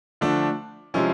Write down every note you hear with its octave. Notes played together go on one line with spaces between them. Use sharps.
D3 F3 A3 D4
C3 F3 G#3 C#4 E4